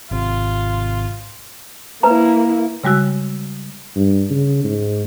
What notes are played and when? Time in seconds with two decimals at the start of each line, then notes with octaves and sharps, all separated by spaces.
0.11 G#1 C3 F4
2.03 A#3 E4 B4 A#5
2.84 C#3 G3 G#3 F#4 E6
3.96 G2
4.30 C#3
4.64 G#2